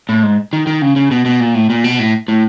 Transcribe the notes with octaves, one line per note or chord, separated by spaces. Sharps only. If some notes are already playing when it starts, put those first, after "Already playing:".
A2
G#2
D#3
D#3
C#3
C#3
B2
B2
A#2
A2
A#2
B2
A2
A2